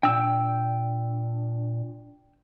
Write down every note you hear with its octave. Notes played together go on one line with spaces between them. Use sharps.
A#2 D4 G5 E6